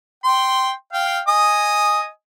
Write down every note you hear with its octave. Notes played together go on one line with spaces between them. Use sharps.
G5 C6
F5 G5
D#5 G#5 D#6